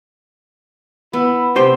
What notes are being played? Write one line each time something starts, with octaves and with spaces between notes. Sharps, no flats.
B3 E4
B1 C3 G4 C5